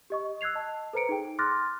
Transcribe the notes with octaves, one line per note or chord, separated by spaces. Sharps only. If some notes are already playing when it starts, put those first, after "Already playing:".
G4 D#5 C#6
E6 F#6 G#6 C7 F7
D#5 A5
A4 B4 C5 A#5 C#7 D7
D#4 G#4 G5
C6 D6 F6 F#6 A6 A#6